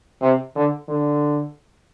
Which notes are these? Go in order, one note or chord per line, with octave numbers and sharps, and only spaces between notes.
C3
D3
D3